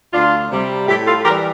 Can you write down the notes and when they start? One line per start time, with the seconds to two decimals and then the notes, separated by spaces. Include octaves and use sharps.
0.13 D2 D4 F4
0.51 C3 G3
0.88 A2 E4 G4
1.06 F4 A4
1.25 E3 G4 A#4
1.29 G3